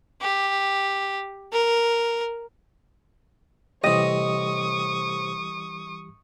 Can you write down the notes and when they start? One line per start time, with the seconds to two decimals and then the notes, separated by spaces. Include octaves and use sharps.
0.21 G4
1.53 A#4
3.84 A2 C3 E3 G3 G4 D#5 C#6 D#6